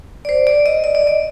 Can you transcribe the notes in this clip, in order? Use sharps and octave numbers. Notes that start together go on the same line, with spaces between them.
D5
C5
D5
D#5
D#5
D5
D#5